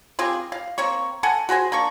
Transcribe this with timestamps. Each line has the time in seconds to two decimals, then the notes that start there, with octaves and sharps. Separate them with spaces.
0.19 C4 F4 G4 G#4
0.52 F5
0.78 A#3 C4 C#5 C#6
1.23 A4 F#5 G#5
1.49 F#4 G#4 C5 G#5
1.72 A#3 D4 C#6